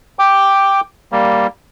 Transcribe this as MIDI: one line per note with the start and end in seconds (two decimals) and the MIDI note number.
0.19 0.80 79
0.19 0.80 86
1.12 1.47 55
1.12 1.47 58